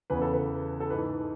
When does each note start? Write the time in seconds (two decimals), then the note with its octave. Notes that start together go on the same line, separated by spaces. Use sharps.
0.10 E2 C#3 E3 B4
0.21 A4
0.34 B4
0.80 A4
0.90 G#2 E3 B4